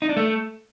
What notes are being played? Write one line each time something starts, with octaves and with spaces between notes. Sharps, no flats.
D#4
D4
A3